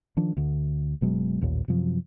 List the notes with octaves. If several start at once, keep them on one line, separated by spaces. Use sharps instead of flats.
D#3 F3 D4
D2 D3
F#1 B2 F#3 G#3
A1 D#2 A#2
F#2 C3 F3 F#3